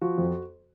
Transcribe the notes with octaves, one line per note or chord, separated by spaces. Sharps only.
F3 F#4
F2